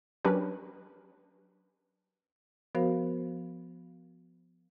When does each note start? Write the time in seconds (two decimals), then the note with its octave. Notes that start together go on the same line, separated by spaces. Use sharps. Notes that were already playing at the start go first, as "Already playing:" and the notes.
0.25 F#3 C#4 D4 G4 A#4 B4
2.75 F3 B3 F#4 A#4 C5 F5